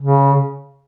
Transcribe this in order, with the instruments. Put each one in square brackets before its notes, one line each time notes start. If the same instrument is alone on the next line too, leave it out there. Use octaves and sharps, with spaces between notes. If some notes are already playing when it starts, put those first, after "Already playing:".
[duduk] C#3